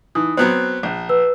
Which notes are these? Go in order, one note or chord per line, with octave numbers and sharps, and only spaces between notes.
E3 D#4 D#6
F#3 B3 C4 F#6
A#1
B4 E6